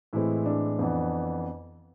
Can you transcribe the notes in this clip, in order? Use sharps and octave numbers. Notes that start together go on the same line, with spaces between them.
A2 E3 G#3 C4 E4
D4
F2 E3 B3